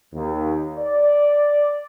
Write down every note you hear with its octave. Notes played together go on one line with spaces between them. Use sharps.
D#2
D5